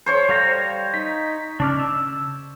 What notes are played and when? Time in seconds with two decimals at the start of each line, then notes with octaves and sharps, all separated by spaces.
0.06 C5 C#5 C#6
0.29 G3 F5 A#5
0.94 D#4 B6
1.60 C#3 D4 D5 F6
1.80 E6